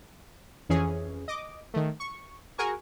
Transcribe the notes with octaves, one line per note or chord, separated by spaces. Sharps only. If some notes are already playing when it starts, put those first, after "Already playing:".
F2 E3 C#4 G#4
D#5 D6
D#3 A3
C#6
F#4 G#4 A#4 G#5 C#6